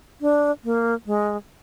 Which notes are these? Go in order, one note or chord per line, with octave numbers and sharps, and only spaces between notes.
D4
A#3
G#3